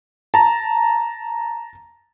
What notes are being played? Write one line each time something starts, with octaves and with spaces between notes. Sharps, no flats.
A5 A#5